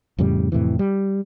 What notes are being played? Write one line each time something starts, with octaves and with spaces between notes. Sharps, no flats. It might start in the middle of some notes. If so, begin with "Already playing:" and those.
F2 A2 C#3 G3
F2 A2 C3 E3
G3